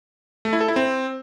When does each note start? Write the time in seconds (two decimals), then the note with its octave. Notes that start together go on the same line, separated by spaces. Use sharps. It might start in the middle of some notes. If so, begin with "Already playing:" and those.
0.45 A3
0.53 E4
0.61 A4
0.68 E4
0.76 C4